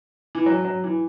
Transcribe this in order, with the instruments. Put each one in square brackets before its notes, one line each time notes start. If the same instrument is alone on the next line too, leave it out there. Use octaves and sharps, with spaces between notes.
[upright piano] E3
F#3
F#3
E3